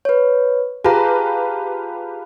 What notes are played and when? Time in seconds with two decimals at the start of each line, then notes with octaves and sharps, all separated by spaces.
0.05 B4 C#5
0.84 F4 G4 G#4 B4 A5 A#5